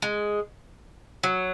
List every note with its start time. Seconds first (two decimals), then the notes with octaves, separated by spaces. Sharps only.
0.02 G#3
1.23 F#3